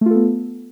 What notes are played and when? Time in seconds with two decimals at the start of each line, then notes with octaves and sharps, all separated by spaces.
0.01 A3
0.06 F4
0.11 A4
0.15 B3